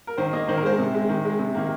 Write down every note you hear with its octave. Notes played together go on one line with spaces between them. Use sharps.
A#4
D#3 C5
A#3 D#5
D#3 C5
A#4
G#3 C5
C3
G#3
D#3
G#3
C3
D#3 A#3